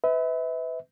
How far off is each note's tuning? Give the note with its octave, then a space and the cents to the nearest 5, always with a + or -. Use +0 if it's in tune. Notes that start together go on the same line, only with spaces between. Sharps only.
B4 +25 E5 -35